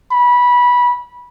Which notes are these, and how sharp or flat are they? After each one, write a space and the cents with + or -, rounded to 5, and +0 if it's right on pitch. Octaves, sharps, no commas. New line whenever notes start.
B5 -15